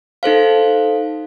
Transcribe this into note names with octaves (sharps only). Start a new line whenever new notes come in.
D#4 A4 C5 F5